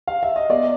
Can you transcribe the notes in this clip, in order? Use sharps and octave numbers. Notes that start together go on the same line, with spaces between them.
F5
E5
D#5
B3 D5